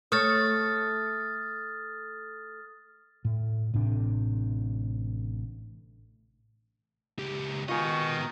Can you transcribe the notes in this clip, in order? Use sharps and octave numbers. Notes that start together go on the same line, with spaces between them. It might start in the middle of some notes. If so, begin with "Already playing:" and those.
A3 C#5 D#6 F6 A6
A2
A1 A2 C3 D4
C#2 G4
D#3 G#3 B3 F4 D#5 C#6